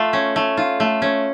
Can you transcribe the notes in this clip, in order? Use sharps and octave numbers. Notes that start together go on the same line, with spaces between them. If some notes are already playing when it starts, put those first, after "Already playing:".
Already playing: A3 F4
C#4
A3
F4
A3
C#4